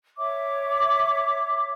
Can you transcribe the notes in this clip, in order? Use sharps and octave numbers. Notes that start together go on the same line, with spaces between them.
C#5 E5 D6